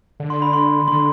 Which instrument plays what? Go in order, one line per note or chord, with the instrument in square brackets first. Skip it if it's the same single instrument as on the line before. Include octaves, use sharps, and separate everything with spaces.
[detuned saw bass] D3
[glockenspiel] C6
B5
C6
[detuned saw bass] D3 [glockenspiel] C6